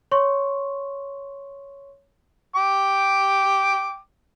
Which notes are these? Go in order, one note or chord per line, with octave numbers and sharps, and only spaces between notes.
C#5 C6 C#6
G5 D6